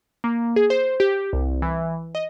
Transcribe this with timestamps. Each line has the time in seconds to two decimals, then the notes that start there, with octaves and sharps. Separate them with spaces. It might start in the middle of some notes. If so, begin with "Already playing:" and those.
0.24 A#3
0.56 G#4
0.70 C5
1.00 G4
1.33 C2
1.62 E3
2.15 D#5